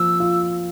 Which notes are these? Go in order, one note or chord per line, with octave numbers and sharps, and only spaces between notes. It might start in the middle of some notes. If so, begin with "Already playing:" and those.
Already playing: F3 A#3 E6
F4